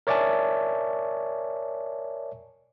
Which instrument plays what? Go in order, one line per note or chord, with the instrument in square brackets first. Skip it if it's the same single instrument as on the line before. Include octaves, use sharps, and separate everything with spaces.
[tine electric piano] A#4 C#5 D5 E5 G#5 A5